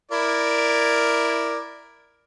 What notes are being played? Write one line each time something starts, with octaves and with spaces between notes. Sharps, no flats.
E4 A#4 D5